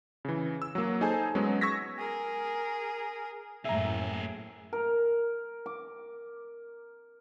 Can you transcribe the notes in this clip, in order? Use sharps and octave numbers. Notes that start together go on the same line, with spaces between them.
C#3 E3
E6
F#3 A#3
D#4 G#4 A4 C5 G#5 A5
F#3 G#3 B3 C#4
C#6 E6 G#6 A#6 B6
G#4 A#4
F#2 A2 A#3 G#4 E5 A#5
A#4
D6